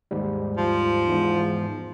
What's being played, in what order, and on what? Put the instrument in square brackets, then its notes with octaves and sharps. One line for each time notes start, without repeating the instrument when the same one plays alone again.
[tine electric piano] D#2 G#2 G3
[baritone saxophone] F3
[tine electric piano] E2 G#2